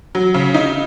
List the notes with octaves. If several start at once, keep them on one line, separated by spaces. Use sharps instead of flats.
F#3
C#3
D#4